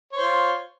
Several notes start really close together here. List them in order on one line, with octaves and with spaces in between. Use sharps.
C#5 C5 F4